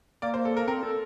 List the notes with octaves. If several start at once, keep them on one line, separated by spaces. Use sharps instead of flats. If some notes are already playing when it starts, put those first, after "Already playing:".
A#3 D5
C5
A4
A#4
C4 A#4
A4